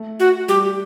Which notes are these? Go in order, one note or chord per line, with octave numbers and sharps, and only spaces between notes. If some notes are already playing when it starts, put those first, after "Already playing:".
Already playing: A3
F#4
G3 G4